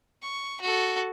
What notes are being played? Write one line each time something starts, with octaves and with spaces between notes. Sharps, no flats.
C#6
F#4 A4